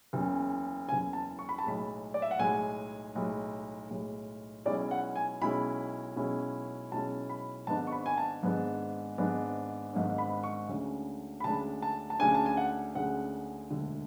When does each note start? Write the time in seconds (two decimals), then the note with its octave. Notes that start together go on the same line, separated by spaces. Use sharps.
0.13 F#1 E2 C#3
0.88 F#1 E2 C#3 G#5
1.13 A5
1.39 C#6
1.49 B5
1.59 A5
1.64 B1 A2 G#3 B5
2.14 D5
2.22 E5
2.31 F#5
2.39 B1 A2 G#3 G#5
3.15 B1 A2 G#3
3.90 B1 A2 G#3
4.66 B1 B2 G#3 C#4 E4 D5
4.91 F#5
5.16 G#5
5.41 B1 B2 G#3 C#4 E4 B5
6.16 B1 B2 G#3 C#4 E4
6.92 B1 B2 G#3 C#4 E4 A5
7.29 B5
7.67 G#1 G#2 G#3 B3 D4 A5
7.87 C#6
7.92 B5
8.06 G#5
8.18 A5
8.43 G#1 G#2 G#3 B3 D4
9.18 G#1 G#2 G#3 B3 D4
9.93 G#1 G#2 G#3 B3 D4
10.18 B5
10.43 C#6
10.68 D2 C#3 G#3 D4
11.40 B5
11.44 D2 C#3 G#3 D4 A5
11.82 A5
12.10 A5
12.19 D2 C#3 G#3 D4 G#5
12.35 A5
12.46 G#5
12.57 F#5
12.95 D2 C#3 G#3 D4 F#5
13.70 E1 D2 D3